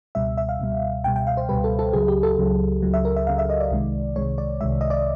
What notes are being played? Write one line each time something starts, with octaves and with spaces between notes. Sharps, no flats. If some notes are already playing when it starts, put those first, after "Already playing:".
C#2 B2 G3 E5
E5
F5
C#2 B2 G3
C#2 B2 G3 G5
G5
F5
C5
C#2 B2 G3 B4
A4
A4
C#2 C#3 F#3 G#4
G4
A4
C#2 C#3 F#3
C#2 C#3 F#3
E5
A#4
E5
C#2 C#3 F#3 F5
E5
D#5
D5
C2 C3 D#3 G#3
C2 C3 D#3 G#3 C#5
D5
C2 C3 D#3 G#3 E5
D#5
D5